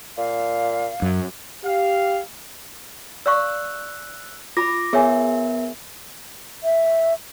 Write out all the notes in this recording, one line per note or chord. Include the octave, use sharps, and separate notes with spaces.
A#2 F5
F#2
G4 F5
D5 F5 C#6 E6 F#6
F4 B5 D6 A#6
B3 G#4 A#4 C#5 E5 G#5
E5